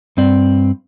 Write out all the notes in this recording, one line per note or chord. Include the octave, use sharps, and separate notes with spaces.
G2 C4 D5